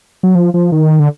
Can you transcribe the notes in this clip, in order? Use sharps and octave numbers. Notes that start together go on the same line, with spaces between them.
F#3
F3
F3
D#3
D3